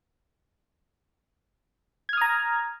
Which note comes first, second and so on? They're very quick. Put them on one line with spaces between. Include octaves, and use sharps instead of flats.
G#6 F6 D#6 A#5